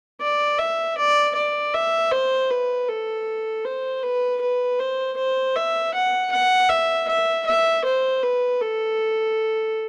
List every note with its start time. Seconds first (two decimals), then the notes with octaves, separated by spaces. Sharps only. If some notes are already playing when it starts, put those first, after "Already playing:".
0.21 D5
0.59 E5
0.98 D5
1.35 D5
1.74 E5
2.12 C5
2.50 B4
2.88 A4
3.65 C5
4.03 B4
4.41 B4
4.79 C5
5.17 C5
5.56 E5
5.94 F#5
6.32 F#5
6.69 E5
7.08 E5
7.46 E5
7.84 C5
8.23 B4
8.61 A4